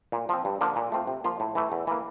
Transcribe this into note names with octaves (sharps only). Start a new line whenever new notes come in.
A#2
F3 C4
G2
D3 F3 A#3 D4
A#2
A3 C4 F4
C3
F3 A#3 F4
A2
E3 A3
E2
E3 A#3